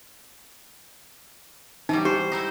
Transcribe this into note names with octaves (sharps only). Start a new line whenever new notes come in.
E3 F#3 G3 D#4
G4 C5
D#4 E4 C5